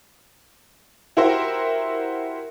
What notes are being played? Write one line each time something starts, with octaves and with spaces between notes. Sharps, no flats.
E4 F#4 G4 A#4 C5 E5